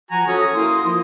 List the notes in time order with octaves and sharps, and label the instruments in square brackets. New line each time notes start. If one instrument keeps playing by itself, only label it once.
[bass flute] F3 [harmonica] F#4 G#5 A#5 [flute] G#6
[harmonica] C#4 [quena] F#4 [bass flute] A4 [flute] D#6
[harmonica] A#3 [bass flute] E4 [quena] C6
[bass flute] F3 [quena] C6